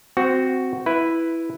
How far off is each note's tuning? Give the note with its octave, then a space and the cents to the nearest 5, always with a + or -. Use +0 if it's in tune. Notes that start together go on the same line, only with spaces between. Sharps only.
C4 -10 F#4 +0
E4 +0 B4 +0